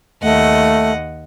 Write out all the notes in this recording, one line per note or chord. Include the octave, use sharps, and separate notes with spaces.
D#2 A3 D#5 F#5